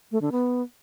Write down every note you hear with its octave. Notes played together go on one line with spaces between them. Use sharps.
A3
D3
B3